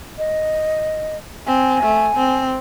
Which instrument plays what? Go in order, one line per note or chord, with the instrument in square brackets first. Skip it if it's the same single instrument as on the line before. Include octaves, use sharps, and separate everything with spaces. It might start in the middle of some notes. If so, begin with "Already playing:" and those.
[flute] D#5
[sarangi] C4 [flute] G#5
[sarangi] A3
C4